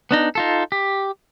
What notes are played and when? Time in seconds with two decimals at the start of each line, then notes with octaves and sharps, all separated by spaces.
0.11 B3 D4 D#4
0.35 D#4 F4 A4
0.72 G4